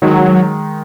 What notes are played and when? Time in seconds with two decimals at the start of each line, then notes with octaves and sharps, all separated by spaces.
0.02 D#3 F#3 G#3 D#4